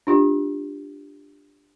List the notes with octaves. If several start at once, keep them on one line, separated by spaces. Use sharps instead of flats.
D4 F4 G4